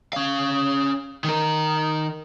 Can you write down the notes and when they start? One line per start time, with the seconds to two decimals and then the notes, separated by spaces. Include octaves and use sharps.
0.13 C#4 F5
1.24 D#3 A#4